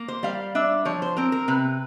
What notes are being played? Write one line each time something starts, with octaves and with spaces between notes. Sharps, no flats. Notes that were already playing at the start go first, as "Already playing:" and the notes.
Already playing: A#3
C5
G3 F5
D4 E5
F3 C#5
C5
C4 A#4
A#4
C3 B4